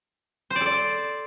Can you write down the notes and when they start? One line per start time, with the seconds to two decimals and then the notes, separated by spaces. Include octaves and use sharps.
0.50 C5
0.56 D5
0.61 A4
0.66 D5